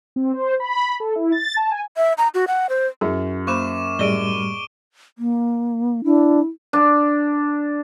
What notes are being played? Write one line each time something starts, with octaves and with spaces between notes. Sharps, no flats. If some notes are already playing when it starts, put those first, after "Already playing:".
C4
C5
B5
A4
E4
A6
A5
G#5
E5
A#5
F#4
F#5
C5
F#2 E4 G#4
A#3 C5 B5 C#6 D6 E7
A2 G3 G#4 D5 D#5 D7 D#7 G7
A#3
D4 E4
D4